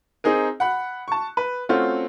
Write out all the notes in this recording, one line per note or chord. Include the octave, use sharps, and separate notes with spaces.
C4 D#4 G#4 A#4
F#5 B5 F#6
A5 C#6
B4
A3 C4 C#4 F4 F#4